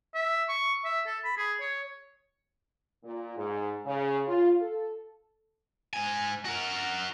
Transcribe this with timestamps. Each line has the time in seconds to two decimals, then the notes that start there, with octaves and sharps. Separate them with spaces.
0.15 E5
0.49 C#6
0.85 E5
1.06 A4
1.24 B5
1.37 G#4
1.61 C#5
3.04 A#2
3.36 G#2
3.86 C#3
4.28 F4
4.61 A4
5.93 G#2 G#5
6.45 F#4 A#4